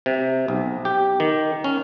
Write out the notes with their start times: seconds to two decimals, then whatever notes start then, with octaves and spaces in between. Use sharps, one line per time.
0.06 C3
0.48 B1
0.85 G4
1.20 D#3
1.64 C#4